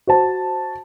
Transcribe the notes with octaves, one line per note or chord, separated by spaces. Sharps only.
F#4 C5 A5